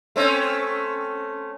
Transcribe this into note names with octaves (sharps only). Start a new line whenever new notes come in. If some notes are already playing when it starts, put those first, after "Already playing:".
A3 C4 C#4